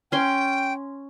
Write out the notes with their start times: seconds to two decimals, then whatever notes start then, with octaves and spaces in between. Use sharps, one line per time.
0.12 C#4 G5 C6